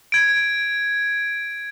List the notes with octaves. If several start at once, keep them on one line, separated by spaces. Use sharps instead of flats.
G#6 D7